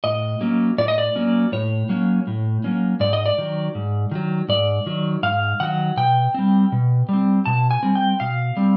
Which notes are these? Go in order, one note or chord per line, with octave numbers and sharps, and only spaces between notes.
A2 D#5
F#3 A#3 C#4
A2 D5
D#5
D5
F#3 A#3 C#4
A2 C#5
F#3 A#3 C#4
A2
F#3 A#3 C#4
G#2 D5
D#5
D5
D#3 F#3
G#2
D#3 F#3
G#2 D5
D#3 F#3
G#2 F5
D#3 F#3 F#5
B2 G5
G3 C4
B2
G3 C4
B2 A5
G#5
G3 C4
G5
B2 F5
G3 C4